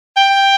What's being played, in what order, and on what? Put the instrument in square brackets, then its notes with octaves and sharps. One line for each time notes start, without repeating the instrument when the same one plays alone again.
[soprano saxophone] G5